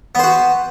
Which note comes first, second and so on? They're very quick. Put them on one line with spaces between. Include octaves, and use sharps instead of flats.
B3 C5 F#4